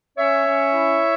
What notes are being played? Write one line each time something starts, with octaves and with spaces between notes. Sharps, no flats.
C#4 C#5 E5
C#4
E4